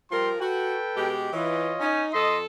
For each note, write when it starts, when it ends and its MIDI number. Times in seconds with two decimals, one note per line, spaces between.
0.11 0.37 53
0.11 0.33 55
0.11 0.37 70
0.11 0.33 79
0.11 0.33 84
0.40 0.75 66
0.40 1.15 69
0.40 1.15 71
0.40 1.15 79
0.96 1.30 47
0.96 1.30 56
0.96 1.30 67
1.33 1.72 52
1.33 1.88 65
1.33 1.88 73
1.33 1.88 75
1.80 2.03 61
1.80 2.11 63
2.13 2.45 41
2.13 2.45 69
2.13 2.39 75
2.13 2.37 84